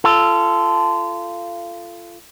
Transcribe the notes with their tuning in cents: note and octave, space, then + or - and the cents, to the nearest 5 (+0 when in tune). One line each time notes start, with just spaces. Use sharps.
F4 -25 A4 +0